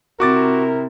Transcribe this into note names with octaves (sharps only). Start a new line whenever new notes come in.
C3 C4 E4 F#4 A#4 D6 A6